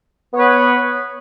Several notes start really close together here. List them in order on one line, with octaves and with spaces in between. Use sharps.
B3 C#5 B4